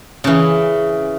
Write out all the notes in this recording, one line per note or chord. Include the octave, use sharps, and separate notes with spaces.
C#3 E3